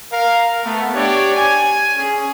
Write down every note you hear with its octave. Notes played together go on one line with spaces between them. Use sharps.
A#4 F5
A3 B3
D4 G4 C#5 D5
G#5
C#4 G#4